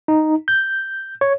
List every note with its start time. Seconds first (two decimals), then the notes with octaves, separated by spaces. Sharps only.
0.08 D#4
0.48 G6
1.21 C#5